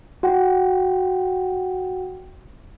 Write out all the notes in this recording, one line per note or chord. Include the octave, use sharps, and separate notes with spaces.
F#4 F#5 G5